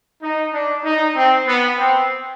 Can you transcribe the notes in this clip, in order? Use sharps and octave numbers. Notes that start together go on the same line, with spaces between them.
D#4
D4
D#4
C4
B3
C4